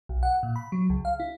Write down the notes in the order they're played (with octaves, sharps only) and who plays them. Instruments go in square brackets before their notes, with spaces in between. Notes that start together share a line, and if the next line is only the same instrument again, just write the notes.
[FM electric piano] B1
F#5
A#2
B5
F#3
C#2
F5
E4